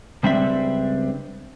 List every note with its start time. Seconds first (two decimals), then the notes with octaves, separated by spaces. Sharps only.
0.23 C#2 G3 C4 D4 E5